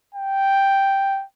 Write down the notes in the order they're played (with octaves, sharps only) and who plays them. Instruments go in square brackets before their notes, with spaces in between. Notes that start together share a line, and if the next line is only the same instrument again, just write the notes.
[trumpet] G5